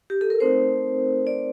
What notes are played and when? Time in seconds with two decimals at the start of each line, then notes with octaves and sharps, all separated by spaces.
0.10 G4
0.21 A4
0.30 A#4
0.40 A3 C4 D#4 C5
1.27 D5